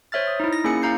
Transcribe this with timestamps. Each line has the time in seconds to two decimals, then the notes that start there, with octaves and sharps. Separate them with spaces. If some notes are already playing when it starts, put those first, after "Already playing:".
0.12 C5 C#5 E5 F6 A6
0.27 D#6
0.40 D#4 E4
0.53 A#6
0.64 A#3 C#4 G#4 G#5 C#7
0.82 C#4 E4 F5 A#5 G6 C7